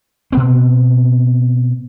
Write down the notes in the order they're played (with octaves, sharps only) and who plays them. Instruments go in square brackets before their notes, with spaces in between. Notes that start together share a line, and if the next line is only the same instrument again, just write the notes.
[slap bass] B2 B3 C4